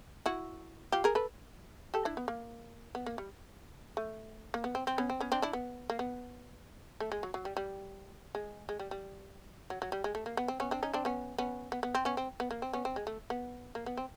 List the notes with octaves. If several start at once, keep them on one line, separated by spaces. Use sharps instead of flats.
E4 F#4
F4 G4
G#4 A#4
A4 B4
G4 A4
D4 E4
B3
A#3
B3
A#3
G3
A3
A#3
B3
C4
C4
B3 C#4
C4
B3 C#4
C4 D4
D4 E4
B3
A#3
B3
A3
G#3
F#3
F#3
G3
G3
G#3
G#3
G3
G3
F#3
F#3
G3
G#3
A3
A#3
B3
C4
B3 C#4
C4 D4
C#4 D#4
C4 D4
B3 C#4
B3 C#4
B3
B3
C4
B3 C#4
C4
B3
A#3
C4
B3 C#4
C4
G#3
A3
B3
A#3
B3
C4